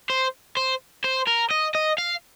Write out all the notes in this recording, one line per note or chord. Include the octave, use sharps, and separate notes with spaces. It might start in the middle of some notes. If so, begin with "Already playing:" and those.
C5
C5
C5
A#4
D#5
D#5
F5